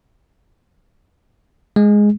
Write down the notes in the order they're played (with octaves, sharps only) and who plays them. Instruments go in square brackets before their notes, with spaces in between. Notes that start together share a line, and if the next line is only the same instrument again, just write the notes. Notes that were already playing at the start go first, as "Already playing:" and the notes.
[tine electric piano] G#3